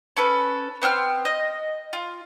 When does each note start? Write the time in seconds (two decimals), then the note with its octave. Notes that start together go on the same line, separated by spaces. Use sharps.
0.17 C#4 A4 B4
0.82 B3 C4 A5 F6
1.25 D#5
1.93 F4